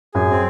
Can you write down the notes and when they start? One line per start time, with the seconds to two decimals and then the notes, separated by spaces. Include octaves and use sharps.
0.14 F#2 G#4
0.30 C4